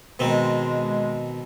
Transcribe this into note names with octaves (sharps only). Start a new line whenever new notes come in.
B2 D#3 G#3 C4